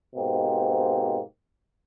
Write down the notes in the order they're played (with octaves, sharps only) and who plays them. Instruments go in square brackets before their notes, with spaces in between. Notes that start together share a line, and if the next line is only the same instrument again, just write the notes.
[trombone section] G#2 B2 A#3 C4 G4